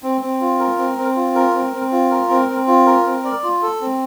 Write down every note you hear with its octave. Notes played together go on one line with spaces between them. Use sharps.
C4
C4
F4
A#4
C4
C4
F4
A#4
C4
C4
F4
A#4
C4
C4
F4
A#4
C4
D5
F4
A4
C4